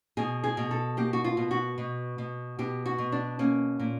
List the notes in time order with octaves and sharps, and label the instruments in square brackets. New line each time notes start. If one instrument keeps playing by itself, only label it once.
[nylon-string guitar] B2 G#4
G#4
B2
A4
A#3 G4
F#4
F4
B2
F#4
B2
B2
B2 G4
F#4
B2
D4
A#3 C#4
A#2